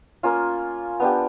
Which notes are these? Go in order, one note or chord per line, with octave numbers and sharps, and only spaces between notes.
A#3 C#4 F4
B3 D4 G4